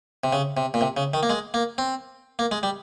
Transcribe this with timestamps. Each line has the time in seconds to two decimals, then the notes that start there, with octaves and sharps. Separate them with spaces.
0.24 C3
0.33 C#3
0.57 C3
0.74 A#2
0.81 C3
0.97 C#3
1.14 D#3
1.23 A#3
1.30 G#3
1.54 A#3
1.78 C4
2.39 A#3
2.51 G#3
2.63 G3